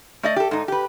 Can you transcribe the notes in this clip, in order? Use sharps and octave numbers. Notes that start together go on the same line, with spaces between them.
A3 D5 D#5
G4 A4
G#2 D#4
G4 B4